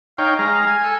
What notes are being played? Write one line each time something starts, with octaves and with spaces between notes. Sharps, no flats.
D#4 C#5 F5 G5
G#3 F5 A#5
G#5
A4